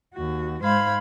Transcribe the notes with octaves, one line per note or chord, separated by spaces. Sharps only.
D#2 F#4
G#2 G#3 C5 F5 B5 G#6